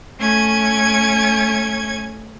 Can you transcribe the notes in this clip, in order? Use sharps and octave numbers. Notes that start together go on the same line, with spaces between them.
A3 C#4 G#6